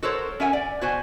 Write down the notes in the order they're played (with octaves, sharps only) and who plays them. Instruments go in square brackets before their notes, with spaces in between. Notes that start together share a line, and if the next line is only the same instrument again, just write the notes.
[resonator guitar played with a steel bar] F#4 A4 A#4 C5 C#5
C#4 A#4 E5 F#5 G#5
D5
B2 F#4 C5 G#5